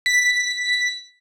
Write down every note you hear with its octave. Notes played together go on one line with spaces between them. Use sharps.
B6